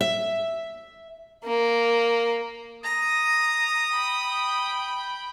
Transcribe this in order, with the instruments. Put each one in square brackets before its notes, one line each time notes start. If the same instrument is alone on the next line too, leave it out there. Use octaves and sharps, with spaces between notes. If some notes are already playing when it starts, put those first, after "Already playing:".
[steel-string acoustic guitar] E5
[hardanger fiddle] A#3
[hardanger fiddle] A#5 [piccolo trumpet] D#6
[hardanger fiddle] G5 B5